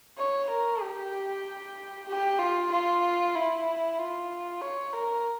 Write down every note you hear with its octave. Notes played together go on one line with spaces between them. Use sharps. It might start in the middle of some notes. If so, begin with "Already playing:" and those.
C#5
A#4
G4
G4
F4
F4
E4
F4
C#5
A#4